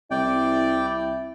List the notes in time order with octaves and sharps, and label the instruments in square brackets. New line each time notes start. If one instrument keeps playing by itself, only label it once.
[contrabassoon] C2 [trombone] E4 [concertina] D5 G5